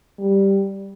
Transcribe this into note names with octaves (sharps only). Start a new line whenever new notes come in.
G3